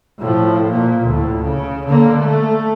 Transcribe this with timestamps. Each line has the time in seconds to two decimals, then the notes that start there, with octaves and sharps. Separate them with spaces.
0.19 A2 F3
0.67 A#2
1.05 D2 A2
1.42 C#3
1.86 D3 A#3
2.19 A3